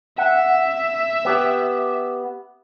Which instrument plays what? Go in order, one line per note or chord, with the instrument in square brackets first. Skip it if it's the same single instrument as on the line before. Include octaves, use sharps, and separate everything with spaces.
[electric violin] E5 [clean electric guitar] F#5
[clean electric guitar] B3 G4